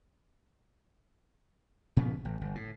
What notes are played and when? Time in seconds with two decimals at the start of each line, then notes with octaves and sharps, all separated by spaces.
1.97 A#2 C#3 F3 B3
2.25 A1
2.41 G1
2.55 A2